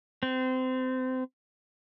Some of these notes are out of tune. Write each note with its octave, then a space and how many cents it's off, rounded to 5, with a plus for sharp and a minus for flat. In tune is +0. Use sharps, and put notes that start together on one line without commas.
C4 -25